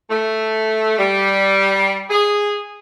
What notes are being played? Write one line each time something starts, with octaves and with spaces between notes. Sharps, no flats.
A3
G3
G#4